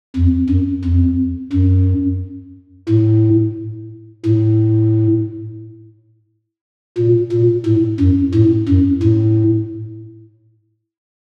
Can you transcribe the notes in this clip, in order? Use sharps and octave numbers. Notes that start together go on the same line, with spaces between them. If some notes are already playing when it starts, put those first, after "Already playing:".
F2
F#2
F2
F#2
A2
A2
A#2
A#2
A2
F#2
A2
F#2
A2